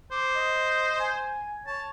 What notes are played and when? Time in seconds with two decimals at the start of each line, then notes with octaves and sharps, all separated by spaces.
0.12 C5 D6
0.35 D#5
1.00 G#5
1.67 C#5 A5